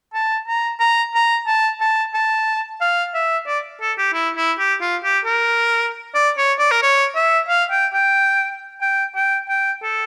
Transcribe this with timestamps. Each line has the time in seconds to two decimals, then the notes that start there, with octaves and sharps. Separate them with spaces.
0.14 A5
0.47 A#5
0.80 A#5
1.14 A#5
1.47 A5
1.81 A5
2.14 A5
2.81 F5
3.14 E5
3.47 D5
3.81 A4
3.98 G4
4.14 E4
4.37 E4
4.59 G4
4.81 F4
5.03 G4
5.25 A#4
6.15 D5
6.38 C#5
6.59 D5
6.71 A#4
6.82 C#5
7.16 E5
7.48 F5
7.71 G5
7.93 G5
8.82 G5
9.15 G5
9.49 G5
9.83 A4